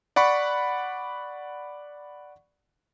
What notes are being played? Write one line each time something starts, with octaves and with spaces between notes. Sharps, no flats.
D5 F#5 B5 C#6